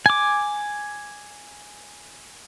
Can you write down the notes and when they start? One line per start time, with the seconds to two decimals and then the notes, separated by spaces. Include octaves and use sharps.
0.06 G#5 D6